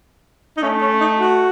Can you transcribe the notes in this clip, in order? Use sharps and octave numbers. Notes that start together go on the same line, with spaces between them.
D#4
A3 C#4
C#4
D#4
F#4